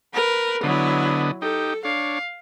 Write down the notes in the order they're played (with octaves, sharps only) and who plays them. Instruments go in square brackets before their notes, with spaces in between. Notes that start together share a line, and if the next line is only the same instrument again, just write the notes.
[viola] A#4 B4
[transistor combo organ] D3 B3 D#5 [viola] F#3 E4
[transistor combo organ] D#4 G4 [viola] A4
[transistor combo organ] D4 C#5 [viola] F5